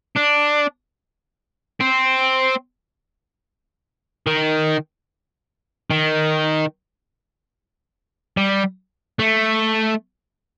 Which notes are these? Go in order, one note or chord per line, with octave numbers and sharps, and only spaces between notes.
D4
C4
D#3
D#3
G3
A3